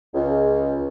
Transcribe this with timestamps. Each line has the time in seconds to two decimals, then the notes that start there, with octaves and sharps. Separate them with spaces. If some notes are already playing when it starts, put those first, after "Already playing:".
0.14 C#2